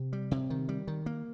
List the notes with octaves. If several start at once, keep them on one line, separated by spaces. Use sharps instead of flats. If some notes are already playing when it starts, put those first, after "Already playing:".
Already playing: C3
G3
C3
D#3
G3
D#3
A#3